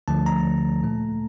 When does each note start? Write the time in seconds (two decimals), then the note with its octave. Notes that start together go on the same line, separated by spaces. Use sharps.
0.08 D2 D3 F3 A3 A5
0.26 A#5
0.84 A#2 A3